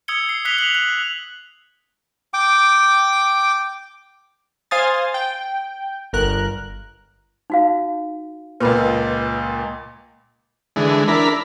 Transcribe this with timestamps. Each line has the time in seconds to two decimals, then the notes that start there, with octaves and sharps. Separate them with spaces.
0.08 D#6 E6 G#6 C#7 G7
0.29 C7
0.45 D#6 F#6 B6 C7 F7 G7
0.59 F#7
0.75 F#6
2.34 G5 D6
4.71 C5 F5 G#5 C6 D#6 A6
5.14 G5
6.13 G1 A#4 F#6
7.50 D#4 F#4 F5
8.61 C#2 A#2 B4 B5
10.76 D3 E3 G#3
11.08 D4 E4 A#4 B5